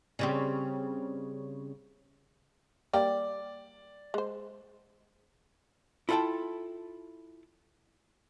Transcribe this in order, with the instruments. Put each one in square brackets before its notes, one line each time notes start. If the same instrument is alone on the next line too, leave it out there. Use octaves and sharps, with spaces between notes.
[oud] C#3 G3 C4
[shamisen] G3 A#3 G5 [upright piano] D5
[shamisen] G#3 C5
[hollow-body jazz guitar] E4 F4 A4 E5 G5 A5